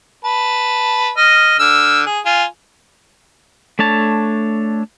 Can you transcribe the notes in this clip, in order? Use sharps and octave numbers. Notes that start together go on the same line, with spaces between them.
B4 A5
D#5 F6
D3 E6 F6
G#4
F4 G#5
A3 D4 C#5 A5